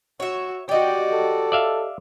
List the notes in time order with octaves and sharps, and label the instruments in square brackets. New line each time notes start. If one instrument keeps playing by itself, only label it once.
[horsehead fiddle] F#4 [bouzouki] C#5 E5
[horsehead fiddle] F#4 D5 [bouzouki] G4 D#5
[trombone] A4
[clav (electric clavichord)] D5 E5 F5